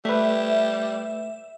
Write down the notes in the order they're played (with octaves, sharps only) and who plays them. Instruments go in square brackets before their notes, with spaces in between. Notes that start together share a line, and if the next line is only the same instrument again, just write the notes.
[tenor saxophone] G3 [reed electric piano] A3 B4 [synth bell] E5